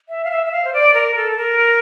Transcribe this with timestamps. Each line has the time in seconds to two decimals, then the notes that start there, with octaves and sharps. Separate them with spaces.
0.09 E5
0.25 F5
0.31 E5
0.46 E5
0.52 F5
0.65 C5
0.73 D5
0.94 A#4
1.16 A4
1.32 A4
1.37 A#4